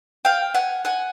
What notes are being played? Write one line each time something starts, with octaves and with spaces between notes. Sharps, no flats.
F5 G5
F#5 G#5
F#5 G#5